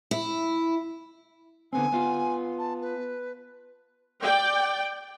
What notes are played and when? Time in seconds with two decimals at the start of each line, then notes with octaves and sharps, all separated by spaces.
0.11 E4
1.73 D3 B3 C4 G#5
1.92 B3 F4
2.58 A5
2.81 B4
4.24 D5 G5